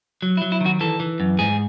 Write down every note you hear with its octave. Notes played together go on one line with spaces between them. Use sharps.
F#3
E4
F#3
E4
D#3 F#4
E3 A4
E3
F#2
G#2 G#4